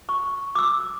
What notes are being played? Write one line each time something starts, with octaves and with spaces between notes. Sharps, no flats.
C#6
D6 E6